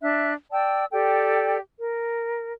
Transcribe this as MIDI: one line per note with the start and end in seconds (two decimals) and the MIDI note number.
0.01 0.33 62
0.01 0.33 76
0.01 0.33 90
0.51 0.85 74
0.51 0.85 79
0.51 0.85 81
0.51 0.85 88
0.92 1.59 67
0.92 1.59 69
0.92 1.59 74
0.92 1.59 79
1.79 2.52 70